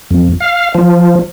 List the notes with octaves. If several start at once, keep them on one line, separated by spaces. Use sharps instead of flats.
F2
F5
F3